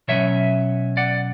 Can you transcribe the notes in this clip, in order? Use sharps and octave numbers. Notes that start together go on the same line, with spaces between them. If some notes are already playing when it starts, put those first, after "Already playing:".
B2 F#3 C#4 C#5 E5
D5 F#5